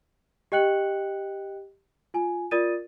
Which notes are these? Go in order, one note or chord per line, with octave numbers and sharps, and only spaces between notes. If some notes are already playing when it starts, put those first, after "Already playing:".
G4 D#5 G5 F#6 C#7 F#7
F4 G#5
F4 A#4 D5 D#6 A6 D#7